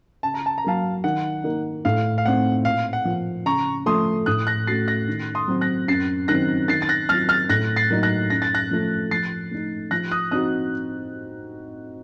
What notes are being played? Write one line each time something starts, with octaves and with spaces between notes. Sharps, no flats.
C#3 A5
A#5
A5
A#5
F#3 A#3 F5 A5
D#3 F#5
A#3 D#4
A2 F5
F5
A3 C4 D#4 F#5
A#2 F5
F#5
F3 A#3
C#3 A#5 C#6
F3 A3 C6 D#6
A2 D#6 F#6
F#6 A#6
A3 C#4 F#4 A6 C7
F#6 A#6
D#3
C6 D#6
F#3 C4
F#6 A#6
F#2 A6 C7
D#3 F#3 C4 F#6 A#6
D#3 A6 C7
A6
F#6 A#6
F#3 C4 F4 F6 A6
F6 A6
A2 F#6 A#6
A6 C7
F#3 A#3 D#4
F#6 A#6
F#2 A#6
A6
F#6 A#6
F3 A3
F3 A6 C7
A3 D#4
F3 F#6 A#6
D#6 F#6
C4 D#4 F#4 D#6 F#6